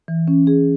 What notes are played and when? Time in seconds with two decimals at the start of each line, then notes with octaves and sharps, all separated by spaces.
0.08 E3
0.28 C#4
0.47 G#4